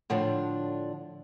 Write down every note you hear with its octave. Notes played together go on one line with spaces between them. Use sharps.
A2 D3 F3 D4